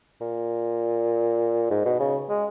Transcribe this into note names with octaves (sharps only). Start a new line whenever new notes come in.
A#2
G#2
B2
C#3
G#3